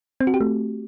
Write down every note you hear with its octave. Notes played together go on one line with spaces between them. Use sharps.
C4
F#4
G4
A3